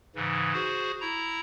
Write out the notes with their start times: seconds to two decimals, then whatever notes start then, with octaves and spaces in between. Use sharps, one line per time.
0.16 G#2 C#3 E3
0.53 F#4 G#4 C5
1.01 E4 A#5